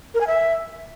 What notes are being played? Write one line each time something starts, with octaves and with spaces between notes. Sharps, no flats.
A#4
G#5
E5